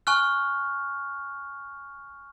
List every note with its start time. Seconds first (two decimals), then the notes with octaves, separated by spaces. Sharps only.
0.07 G#5 C#6 F6 F#6